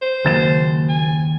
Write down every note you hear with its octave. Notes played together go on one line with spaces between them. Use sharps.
C5
F#1 D#2 A6 E7
G#5